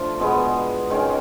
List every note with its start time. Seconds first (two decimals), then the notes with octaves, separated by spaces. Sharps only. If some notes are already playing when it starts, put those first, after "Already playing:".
Already playing: F3 A3 D4 F4
0.20 B2 G#3 B3
0.90 D#3 G#3 C#4